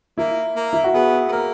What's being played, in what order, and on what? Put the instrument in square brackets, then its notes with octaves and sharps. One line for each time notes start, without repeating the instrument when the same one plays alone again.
[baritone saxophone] A#3 [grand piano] E4
[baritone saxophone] A#3
[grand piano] E4
F#4
[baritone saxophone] B3 [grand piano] G#4
[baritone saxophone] B3
[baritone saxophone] A#3 [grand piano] A#4